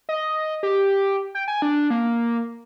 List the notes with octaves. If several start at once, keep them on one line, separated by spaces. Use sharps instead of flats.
D#5
G4
G5
G#5
D4
A#3